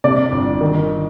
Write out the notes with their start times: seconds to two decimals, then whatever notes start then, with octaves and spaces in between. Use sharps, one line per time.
0.04 C3 D5
0.32 G1
0.61 D#3